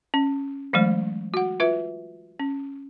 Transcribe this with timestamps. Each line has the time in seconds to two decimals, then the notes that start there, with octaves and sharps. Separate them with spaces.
0.14 C#4
0.73 E3 F#3 G#3 A3 C5
1.34 F#4 F#5
1.60 F4 B4 E5
2.40 C#4